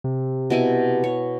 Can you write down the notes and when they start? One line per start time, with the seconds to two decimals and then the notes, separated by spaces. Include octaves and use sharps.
0.04 C3
0.50 B2 E4 G#5
1.04 C#5